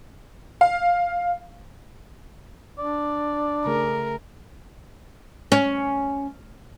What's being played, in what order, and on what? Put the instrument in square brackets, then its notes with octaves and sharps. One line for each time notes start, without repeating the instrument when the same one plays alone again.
[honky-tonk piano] F5
[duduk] D4 [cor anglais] D5
[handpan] C#3 A3 G#4 [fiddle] A#4
[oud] C#4